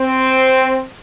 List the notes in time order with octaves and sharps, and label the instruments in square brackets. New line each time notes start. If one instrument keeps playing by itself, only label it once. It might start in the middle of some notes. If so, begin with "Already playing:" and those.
Already playing: [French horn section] C4